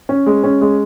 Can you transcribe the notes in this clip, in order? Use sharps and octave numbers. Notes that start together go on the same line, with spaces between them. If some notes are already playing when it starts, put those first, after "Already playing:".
C#4
G#3
C#4
G#3